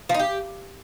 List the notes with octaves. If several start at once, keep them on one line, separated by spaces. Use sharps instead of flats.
F3
D#4
G4